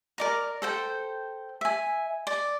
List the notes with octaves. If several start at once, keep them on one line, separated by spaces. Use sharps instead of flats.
A#4 D5 A#5
A4 C5 G5
E5 G#5
D5